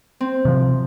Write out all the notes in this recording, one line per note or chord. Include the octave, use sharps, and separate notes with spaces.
C4
C3 F3